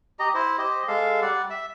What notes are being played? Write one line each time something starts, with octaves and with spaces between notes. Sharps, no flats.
G4 D#5 A#5
E4 C5
G4 C5 D#5
G#3 A4 F5
G3 D5 F#5
E5